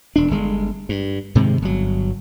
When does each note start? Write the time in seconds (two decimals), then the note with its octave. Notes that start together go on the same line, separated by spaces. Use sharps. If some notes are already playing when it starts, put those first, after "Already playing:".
0.16 E1 D4
0.31 G1 G#3
0.89 G2
1.35 G#2 C3 D#3 G#3
1.62 G1 F#3